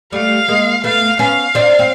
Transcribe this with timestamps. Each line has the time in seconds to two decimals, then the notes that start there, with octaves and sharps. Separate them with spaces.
0.12 G3 A3 F5
0.48 G#3 A#3
0.84 A3 B3 F5
1.19 B3 C#4 F5
1.55 C4 D4
1.79 C4